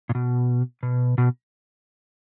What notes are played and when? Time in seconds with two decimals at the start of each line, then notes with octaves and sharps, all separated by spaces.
0.09 A#2
0.15 B2
0.83 B2
1.18 B2